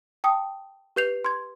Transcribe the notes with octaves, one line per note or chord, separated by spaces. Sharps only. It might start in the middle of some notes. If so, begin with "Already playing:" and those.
G5 A5 D#6
G4 B4 G6 C7 F7
C6 G#6